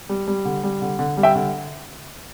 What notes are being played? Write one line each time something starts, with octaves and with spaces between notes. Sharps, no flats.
G3
G3
D3
G3
D3
D3
G3
E5 G5
D3